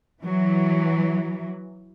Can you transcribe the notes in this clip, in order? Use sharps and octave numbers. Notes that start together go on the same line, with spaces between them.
E3 F#3